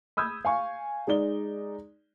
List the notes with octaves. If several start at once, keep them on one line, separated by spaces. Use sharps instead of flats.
B5 D#6 E6 G6 G#6
F5 G#5 C#6
G#3 D#4 D5 G7